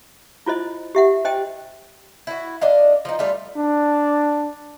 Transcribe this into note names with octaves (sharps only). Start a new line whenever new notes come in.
E4 F4 C5 D#5
G4 E5 F#5
C5 D#5 G5
E4 F#4
D4 D#5 F5
F3 D#4
G3 A3 F4
D4